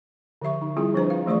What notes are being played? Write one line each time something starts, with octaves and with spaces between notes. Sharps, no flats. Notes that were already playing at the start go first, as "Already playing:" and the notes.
D3 F3 G4 E5 C#6
D#4
G3 C4 E4 F4 G#4
F3 D4 B4 C5 D#5 A#5
F4 F5
E3 A3 G#4 D5 C#6